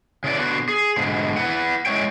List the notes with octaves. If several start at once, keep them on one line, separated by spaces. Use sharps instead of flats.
C#3 E3 D5
D3 B3 F#4
G#4
G#2 B2 D3
E4 B4 F#5
G#3 A#3 C#4 E4 C#5 G5